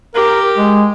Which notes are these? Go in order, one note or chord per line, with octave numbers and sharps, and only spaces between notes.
G4 A#4
G#3